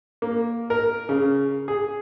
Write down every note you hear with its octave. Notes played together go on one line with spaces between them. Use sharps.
A#3
A#4
C#3
G#4